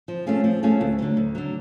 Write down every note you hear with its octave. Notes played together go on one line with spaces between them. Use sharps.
F3
A3 C#4 F4 G#4
F3
A3 C#4 F4 G#4
D2
D3 F#3
D2
D3 F#3